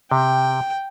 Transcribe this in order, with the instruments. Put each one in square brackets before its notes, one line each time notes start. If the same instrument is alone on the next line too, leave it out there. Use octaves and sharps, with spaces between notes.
[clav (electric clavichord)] C3 [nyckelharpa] G5